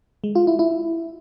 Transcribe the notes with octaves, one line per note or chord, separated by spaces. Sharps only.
G#3
F4
E4
E4